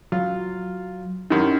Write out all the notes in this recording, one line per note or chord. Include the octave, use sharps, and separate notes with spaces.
F#3 F4
F#2 D#3 E4 G4 A#4